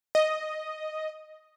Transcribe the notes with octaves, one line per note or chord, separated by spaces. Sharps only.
D#5